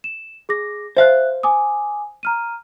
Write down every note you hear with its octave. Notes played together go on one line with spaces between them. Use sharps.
E7
G#4 D6 A#6
C5 E5 F5 F#6
G#5 D6 D#6
A#5 F6 D#7